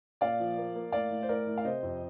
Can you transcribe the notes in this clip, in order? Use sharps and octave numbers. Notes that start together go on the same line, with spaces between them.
A#2 D5 F5
F3
A#3
A#3
A2 D5 F5
A2
C5
A2 A#4 D5
A2
F5
C3 C5 D#5
F2